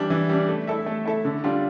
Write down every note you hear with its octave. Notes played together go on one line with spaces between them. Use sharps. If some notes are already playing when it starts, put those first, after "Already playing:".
Already playing: E3 G3 D4
E3
G3 D4
A3
E4 A4 E5
A3
E4 A4 E5
D3
G3 D4 F4